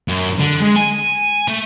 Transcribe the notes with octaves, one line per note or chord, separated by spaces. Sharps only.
F#2
D3
G#3
G#5
A3